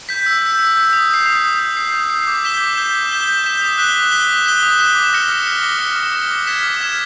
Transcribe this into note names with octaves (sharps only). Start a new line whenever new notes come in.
G6 B6
E6
G6 B6
E6
G6 B6
D#6
G6 C7
D#6
G6 C7
D#6
G6 C7
D#6
C7
G6
D6
G6 B6 E7 G7
D6
G6 B6 E7 G7
D6
G6 B6 E7 G7
D6
G6 B6 E7 G7
D#6
F#6 B6 E7 G7
D#6
F#6 B6 E7 G7
D#6
F#6 B6 E7 G7
D#6
F#6 B6 E7 G7
D6
F6 A#6 C#7
D6
F6 A#6 C#7
D6
F6 A#6 C#7
D6
F6 A#6 C#7
D6
F6 G#6 B6 E7
D6
F6 G#6 B6 E7